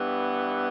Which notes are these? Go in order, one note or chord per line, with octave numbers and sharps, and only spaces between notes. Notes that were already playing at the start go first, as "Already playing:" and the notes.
Already playing: G2 E3 B3